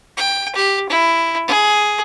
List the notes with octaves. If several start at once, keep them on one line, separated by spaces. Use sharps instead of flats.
G5
G4
E4
G#4